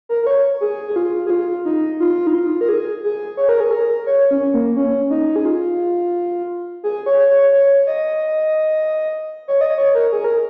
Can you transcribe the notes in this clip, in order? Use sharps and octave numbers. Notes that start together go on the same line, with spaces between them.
A#4
A#4
C#5
G#4
G#4
F4
G#4
F4
D#4
F4
D#4
F4
A#4
G#4
G#4
C#5
A#4
G#4
A#4
C#5
C#4
A#3
C#4
D#4
G#4
F4
G#4
C#5
C#5
C#5
D#5
C#5
D#5
C#5
A#4
G#4
A#4